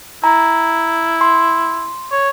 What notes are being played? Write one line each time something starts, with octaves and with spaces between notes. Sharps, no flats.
E4 A#5
C6
C#5